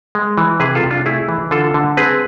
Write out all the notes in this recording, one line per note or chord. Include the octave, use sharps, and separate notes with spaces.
G#3
E3
C3 G#4 B4
F4 A4
C3
D4 F4
A3 E4 G#4
E3
D3 F4 A4
D3
C4 G#4 B4